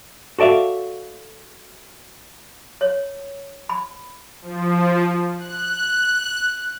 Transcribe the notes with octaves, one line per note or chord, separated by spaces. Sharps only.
F#4 A4 D5 E5 F5
C#5
B5
F3
F#6